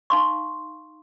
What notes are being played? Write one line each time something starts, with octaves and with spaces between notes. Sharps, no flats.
D#4 F5 C6 C#6